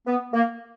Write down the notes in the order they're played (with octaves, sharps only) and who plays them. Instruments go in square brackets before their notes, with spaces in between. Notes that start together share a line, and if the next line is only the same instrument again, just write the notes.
[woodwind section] B3
A#3